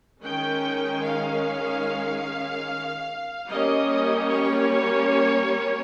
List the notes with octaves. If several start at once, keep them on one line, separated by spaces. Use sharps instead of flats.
D#3 G#3 C#4 G5
F5
G3 A#3 C#4 D#5
C#5